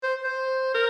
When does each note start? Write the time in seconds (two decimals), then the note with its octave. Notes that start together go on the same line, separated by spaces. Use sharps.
0.03 C5
0.24 C5
0.74 A#4